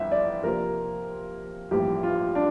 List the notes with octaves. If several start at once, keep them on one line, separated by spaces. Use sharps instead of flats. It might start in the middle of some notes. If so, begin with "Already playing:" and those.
Already playing: G1 F2 E3 E5
D5
C3 F3 A#3 F4 A#4 C5
A1 G2 F3 A#3 E4 G4
F4
D4